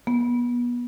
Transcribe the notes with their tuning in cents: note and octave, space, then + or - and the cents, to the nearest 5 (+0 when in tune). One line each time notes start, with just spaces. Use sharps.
B3 -30